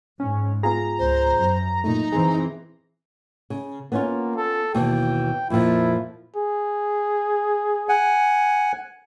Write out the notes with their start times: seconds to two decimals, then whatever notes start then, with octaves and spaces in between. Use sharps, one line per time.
0.20 G#2 C#4
0.63 B3 F4 G#4 A#5
0.99 C#2 C5
1.35 F#2
1.84 A#2 A3 D#4
2.12 E3 C4 G#4
3.50 C#3
3.92 A#3 B3 C#4 F4
4.36 A4
4.74 D#2 B2 E3 G5
5.50 F2 A#2 F3 E4
6.36 G#4
7.89 F#5 G#5